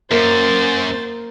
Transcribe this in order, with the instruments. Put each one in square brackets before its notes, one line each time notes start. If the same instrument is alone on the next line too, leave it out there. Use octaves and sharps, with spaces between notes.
[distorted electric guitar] F#2 [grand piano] A#3 [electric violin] C5 A6